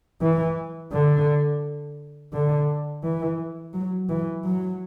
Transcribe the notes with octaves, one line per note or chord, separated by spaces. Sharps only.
E3
D3
D3
E3
F#3
E3
F#3